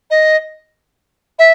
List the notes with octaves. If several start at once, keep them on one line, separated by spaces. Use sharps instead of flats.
D#5
E5